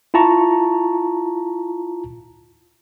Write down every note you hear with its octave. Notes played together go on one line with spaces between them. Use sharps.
E4 F4 A5 A#5 C#6